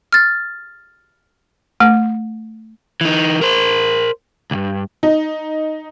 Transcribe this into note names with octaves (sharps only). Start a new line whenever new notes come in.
F6 A6
A3
E3 D#4
A#4 C5
C#2 G2
D#4